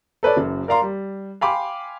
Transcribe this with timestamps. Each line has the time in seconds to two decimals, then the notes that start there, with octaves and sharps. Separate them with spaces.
0.23 A4 B4 C#5 D5
0.37 F#1 F#2
0.68 A#4 D5 F5 A#5 C6
0.82 G3
1.41 F5 G5 G#5 B5 C6 D6